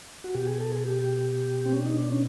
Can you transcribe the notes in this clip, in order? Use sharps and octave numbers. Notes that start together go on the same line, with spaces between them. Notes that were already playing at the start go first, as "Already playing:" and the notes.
F#4
B2 G4
G#4
A4
G#4
G4
C4
C#4
D4
D#4
D4
C#4